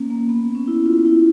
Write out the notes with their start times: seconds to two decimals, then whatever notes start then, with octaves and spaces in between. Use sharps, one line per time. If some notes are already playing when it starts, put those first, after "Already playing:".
Already playing: A#3 C#4
0.10 A#3
0.29 B3
0.55 C#4
0.68 E4
0.86 F4
1.05 E4